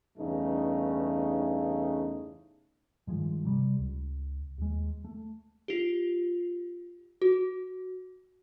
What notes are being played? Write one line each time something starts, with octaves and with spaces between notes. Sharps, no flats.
E2 G2 C#3 A3 D#4
G2 D#3 F3 G#3
C3 G3
C#2
D#2 G#3
A3
F4 G4
F#4